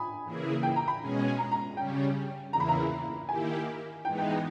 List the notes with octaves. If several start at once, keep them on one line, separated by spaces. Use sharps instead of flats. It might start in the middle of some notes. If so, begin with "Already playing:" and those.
Already playing: G#5 B5 D#6
C#3 E3 A#3 E4 G#4
G5
A#5
B5
B2 G#3 C#4 G#4
A#5
A#5
C#3 G3 C#4 G5
E2 C#3 E3 A#3 E4 A#5
B5
A#5
D#3 A#3 E4 G4 G#5
E3 G#3 B3 D#4 G5
G5
G5